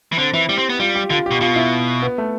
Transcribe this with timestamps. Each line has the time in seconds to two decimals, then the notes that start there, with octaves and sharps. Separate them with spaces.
0.12 E3
0.17 D3 C4
0.34 E3 E4
0.49 G3 G4
0.58 C4
0.69 B3
0.79 G3 F4
0.95 G4
1.10 D3 F4
1.26 B2 G4
1.41 B2 F4
1.56 E4
2.02 B3
2.18 A3